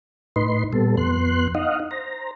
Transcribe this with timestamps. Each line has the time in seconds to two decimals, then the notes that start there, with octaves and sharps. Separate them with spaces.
0.36 A2 D#4 B4 C6
0.73 A#2 G3 B3 A4
0.97 F2 B3 C6 F#6
1.55 D#4 D#5 F5 F#5
1.91 C5 A#5